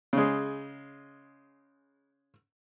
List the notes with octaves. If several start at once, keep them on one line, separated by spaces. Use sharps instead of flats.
C#3 G#3